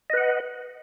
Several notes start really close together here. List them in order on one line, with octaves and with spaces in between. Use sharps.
D#5 B4 F#5